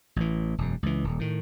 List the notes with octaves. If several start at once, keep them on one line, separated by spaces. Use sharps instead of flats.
A1 E3
E1 F#2
C#2 E3
D#1
A2 D#3